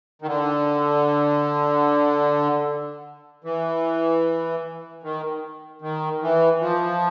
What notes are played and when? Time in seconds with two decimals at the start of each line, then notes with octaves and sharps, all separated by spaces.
0.22 D#3
0.26 D3
3.44 E3
5.03 D#3
5.81 D#3
6.22 E3
6.61 F3